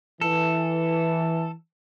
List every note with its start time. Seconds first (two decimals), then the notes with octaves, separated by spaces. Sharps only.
0.21 E3 A4